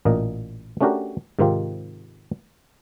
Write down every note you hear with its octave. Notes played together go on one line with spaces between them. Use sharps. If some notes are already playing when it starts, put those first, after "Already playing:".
A1 A#2 A#3 D#5
A3 C#4 D4 F#4 G4 A#4
G#2 C3 D#3 C4 F4 G4